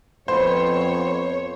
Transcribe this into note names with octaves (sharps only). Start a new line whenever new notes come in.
F2 B3 C5 C#5